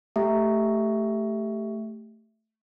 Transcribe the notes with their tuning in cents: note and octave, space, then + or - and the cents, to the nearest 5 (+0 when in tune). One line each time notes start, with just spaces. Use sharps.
A3 +5 G4 +5 E5 +0